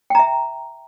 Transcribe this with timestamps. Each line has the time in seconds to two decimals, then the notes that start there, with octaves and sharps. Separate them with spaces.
0.10 G5
0.15 A#5
0.19 E5